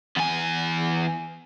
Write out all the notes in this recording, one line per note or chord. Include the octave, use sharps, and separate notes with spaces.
E2 G#5